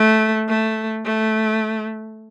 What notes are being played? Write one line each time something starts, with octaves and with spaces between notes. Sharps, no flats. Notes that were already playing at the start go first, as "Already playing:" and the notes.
Already playing: A3
A3
A3